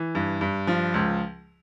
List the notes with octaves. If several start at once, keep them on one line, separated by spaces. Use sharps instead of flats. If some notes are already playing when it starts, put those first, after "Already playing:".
Already playing: E3
G2
G2
F3
C#2